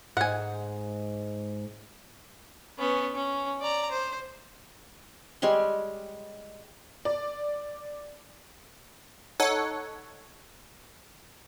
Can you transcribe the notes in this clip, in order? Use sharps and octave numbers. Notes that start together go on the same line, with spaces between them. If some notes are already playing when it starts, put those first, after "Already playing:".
G#2 F#5 G#5
B3 C#4
C#4
D5 A#5
C5
G3 G#3 C#5 C6
D5
D#4 A4 C#5 F#5